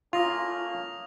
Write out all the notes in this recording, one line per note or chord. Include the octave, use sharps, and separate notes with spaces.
A3 A#3 C#4 F4 D#6 A#6 F7